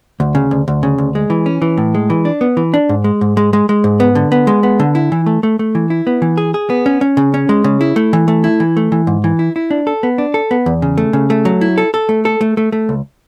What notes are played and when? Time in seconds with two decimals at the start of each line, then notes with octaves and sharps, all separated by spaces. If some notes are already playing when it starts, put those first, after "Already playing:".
0.20 D2
0.35 C#3
0.51 D2
0.68 D2
0.83 C#3
0.98 D2
1.15 G#3
1.30 E3
1.46 C#4
1.62 E3
1.77 A2
1.94 G#3
2.10 E3
2.25 D4
2.41 B3
2.57 E3
2.74 D4
2.89 G#2
3.04 G#3
3.21 G#2
3.37 G#3
3.53 G#3
3.69 G#3
3.84 G#2
4.00 B3
4.15 D3
4.32 B3
4.47 G#3
4.63 B3
4.80 D3
4.95 E4
5.12 E3
5.26 A3
5.43 A3
5.59 A3
5.75 E3
5.90 E4
6.07 B3
6.22 E3
6.38 G#4
6.54 G#4
6.70 B3
6.86 C#4
7.01 C#4
7.17 C#3
7.34 C#4
7.49 G#3
7.64 C#3
7.81 E4
7.96 A3
8.13 E3
8.28 A3
8.44 E4
8.60 E3
8.77 A3
8.92 E3
9.07 G#2
9.24 E3
9.39 E4
9.56 E4
9.71 D4
9.87 A4
10.03 B3
10.18 D4
10.34 A4
10.51 B3
10.66 E2
10.82 C#3
10.98 A3
11.13 C#3
11.30 A3
11.45 F#3
11.61 E4
11.78 A4
11.94 A4
12.09 A3
12.25 A4
12.41 A3
12.57 A3
12.72 A3
12.89 C#2